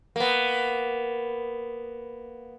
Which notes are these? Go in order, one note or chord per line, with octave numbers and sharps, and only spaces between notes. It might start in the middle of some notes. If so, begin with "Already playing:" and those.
A#3 B3